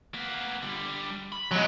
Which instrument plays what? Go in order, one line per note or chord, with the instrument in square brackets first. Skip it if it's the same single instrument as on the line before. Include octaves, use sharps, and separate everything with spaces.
[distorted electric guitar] A#3 B3
D3 G3
B5
[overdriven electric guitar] F#3 G#3